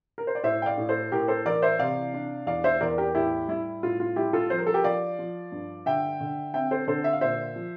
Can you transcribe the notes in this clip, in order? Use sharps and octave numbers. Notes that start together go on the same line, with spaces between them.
A#4
C5
D5
A2 C5 E5
G5
D5 F5
A2
A4 C5
A2 G4 A#4
A4 C5
E3 A#4 D5
C5 E5
C3 D5 F5
D4
E2 D5 F5
C5 E5
E2 A#4 D5
G4 A#4
A2 E4 G4
G3 E4
A2 F4
F4
G3 E4 G4
F4 A4
F3 C5
A#4
A4
G4 A#4
F3 D5 F5
F3
G2
D3 E5 G5
D3
C4 E5 G5
A4 C5
D3 A4 C5
E5
F5
A#2 C5 E5
F3